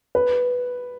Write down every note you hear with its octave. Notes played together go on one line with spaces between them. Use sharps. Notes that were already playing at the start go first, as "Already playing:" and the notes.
B4